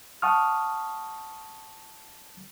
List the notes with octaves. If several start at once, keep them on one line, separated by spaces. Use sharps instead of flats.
F#5 A5 C#6 D#6 F6